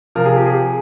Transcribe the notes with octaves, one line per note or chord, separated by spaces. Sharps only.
C3 F3 A#4
G#4
G4
G#4